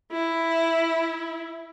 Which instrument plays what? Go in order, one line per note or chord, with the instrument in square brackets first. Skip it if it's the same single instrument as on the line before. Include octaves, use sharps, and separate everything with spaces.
[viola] E4